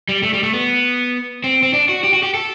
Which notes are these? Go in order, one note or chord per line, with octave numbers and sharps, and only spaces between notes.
G3
A3
G3
A3
B3
C4
C4
D4
F#4
G4
F#4
G4
A4